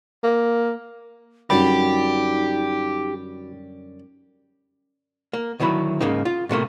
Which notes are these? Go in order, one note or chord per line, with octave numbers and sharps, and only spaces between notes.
A#3
F#2 D3 G3 D#4 F#4 G4 B5
A#3
D2 D#3 F#3 E4 B5
G#2 C#3 A#3 D#4
F4
A2 C3 A3 A#3